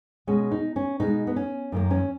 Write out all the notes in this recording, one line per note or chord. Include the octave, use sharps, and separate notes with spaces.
B2 G#3 C#4
D#4
C#4
B2 G#3 D#4
B3
C#4
F#2 D#3 A#3
C#4